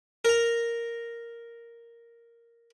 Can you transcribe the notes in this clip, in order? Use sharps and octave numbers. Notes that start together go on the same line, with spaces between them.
A#4 A#5